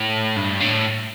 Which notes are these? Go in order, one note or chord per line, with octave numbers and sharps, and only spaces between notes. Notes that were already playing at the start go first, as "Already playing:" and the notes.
Already playing: A2
G2
A2